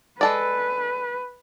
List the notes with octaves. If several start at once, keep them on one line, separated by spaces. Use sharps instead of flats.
G#3 A4 B4 D5